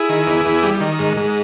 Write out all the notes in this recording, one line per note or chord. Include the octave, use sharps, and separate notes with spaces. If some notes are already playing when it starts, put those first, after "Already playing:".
Already playing: E4 G#4
D#3
E2
E2
G3
D#3
G#2
G#2